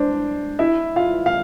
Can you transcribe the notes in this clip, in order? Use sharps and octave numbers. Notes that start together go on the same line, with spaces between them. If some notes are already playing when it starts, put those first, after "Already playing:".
Already playing: D4 C5 D5
E4 E5
F4 F5
F5